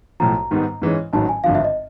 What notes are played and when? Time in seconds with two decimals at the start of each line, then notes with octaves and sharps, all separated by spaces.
0.20 B1 A2 F3 A#5
0.51 G#2 D#3 G3 B3 D#4
0.82 G#2 E3 G#3 C#4
1.13 A1 G#2 D#3 F#3 A5
1.29 G#5
1.44 G#1 G2 D3 F3 F5
1.55 E5
1.64 D#5